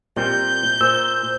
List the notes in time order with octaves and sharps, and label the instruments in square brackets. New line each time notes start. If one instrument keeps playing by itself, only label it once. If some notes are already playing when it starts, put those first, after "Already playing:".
[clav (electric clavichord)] A#2 G3 C4 [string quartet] G6
[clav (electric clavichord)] A#2 [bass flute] C5 [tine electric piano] E6